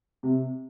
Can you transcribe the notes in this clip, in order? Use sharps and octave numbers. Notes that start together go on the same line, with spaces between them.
C3